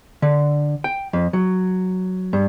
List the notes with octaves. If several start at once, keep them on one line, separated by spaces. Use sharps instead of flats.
D3
G5
F2
F#3
G2